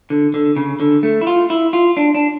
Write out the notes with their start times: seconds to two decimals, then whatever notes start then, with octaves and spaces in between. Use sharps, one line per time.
0.10 D3
0.34 D3
0.56 C#3
0.80 D3
1.03 A3
1.21 E4
1.27 F4
1.50 E4
1.73 F4
1.97 D4
2.15 D4